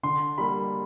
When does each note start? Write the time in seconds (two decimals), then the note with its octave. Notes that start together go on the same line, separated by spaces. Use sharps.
0.03 D3 C6
0.38 G3 A#3 B5